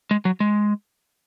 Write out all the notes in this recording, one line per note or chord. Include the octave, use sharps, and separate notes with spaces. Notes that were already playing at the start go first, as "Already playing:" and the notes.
G#3
F#3
G#3